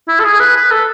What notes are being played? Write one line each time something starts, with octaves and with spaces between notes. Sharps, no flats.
E4
A4
G#4
B4
B4
A4